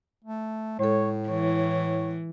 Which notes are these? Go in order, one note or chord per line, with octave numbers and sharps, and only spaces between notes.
A3
A2 G#3 A4 C#5
E3 C#5